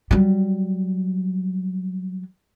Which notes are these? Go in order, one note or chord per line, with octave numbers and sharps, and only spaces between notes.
F#3 G3